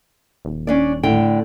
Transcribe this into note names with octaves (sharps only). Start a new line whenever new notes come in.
D#1
C#4 D4 D5
A2 D3 G5